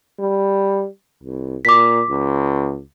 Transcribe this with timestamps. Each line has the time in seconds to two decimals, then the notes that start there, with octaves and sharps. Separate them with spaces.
0.19 G3
1.24 C2
1.65 A#2 D6 B6
2.10 C#2